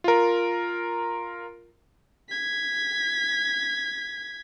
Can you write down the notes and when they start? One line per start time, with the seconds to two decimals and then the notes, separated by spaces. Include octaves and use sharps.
0.04 F4 A#4
2.29 G#6 B6